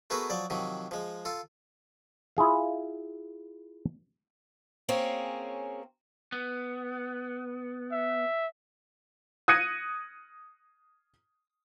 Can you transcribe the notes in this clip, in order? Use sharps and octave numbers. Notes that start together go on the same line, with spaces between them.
A3 B3 F#4 G#4 A#4 B4
F3 F#3 D5
C3 D#3 F3 F#3
F3 G#3
F4 A4
E4 F4 G#4 F5
A#3 C4 C#4 F4 G#4 C#5
B3
E5
D#6 F#6 G#6 A#6 C#7 D#7